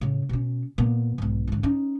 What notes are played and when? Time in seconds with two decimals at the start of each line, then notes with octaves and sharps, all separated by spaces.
0.01 A2 C#3
0.29 B2 C#4
0.78 A#2 B3
1.18 B1 G#2
1.48 G#2 D3
1.63 C#4 D#4